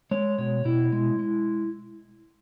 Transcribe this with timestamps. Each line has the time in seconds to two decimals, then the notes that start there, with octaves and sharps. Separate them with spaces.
0.11 G#3 C#5
0.38 B2 C#5
0.65 B2 E4
0.92 G#3
1.19 G#3